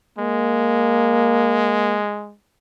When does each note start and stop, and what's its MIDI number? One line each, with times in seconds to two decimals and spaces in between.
0.19 2.34 56
0.19 2.00 58